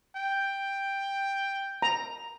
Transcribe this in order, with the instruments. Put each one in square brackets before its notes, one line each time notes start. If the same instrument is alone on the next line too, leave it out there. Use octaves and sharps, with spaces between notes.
[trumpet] G5
[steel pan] A#5